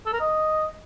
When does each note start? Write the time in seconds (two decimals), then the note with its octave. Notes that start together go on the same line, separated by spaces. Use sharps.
0.06 A4
0.13 A#4
0.20 D#5